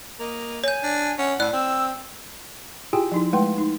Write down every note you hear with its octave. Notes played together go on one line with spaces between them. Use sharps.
A#3 D#5
C#5 G#5 G6
D4
C#4 F#5
A2 D5 F#6
C4 E6
E4 F4 G4 G#4 G5 G#5
F3 D#4 E4
G#3 A3 B4 F#5 G5 C6
D#4